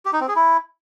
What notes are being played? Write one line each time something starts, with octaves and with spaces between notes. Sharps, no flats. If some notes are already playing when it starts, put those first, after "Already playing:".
G4
D#4
C4
G#4
E4